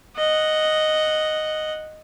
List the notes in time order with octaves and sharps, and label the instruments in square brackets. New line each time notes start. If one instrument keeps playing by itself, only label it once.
[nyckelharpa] D#5 F#5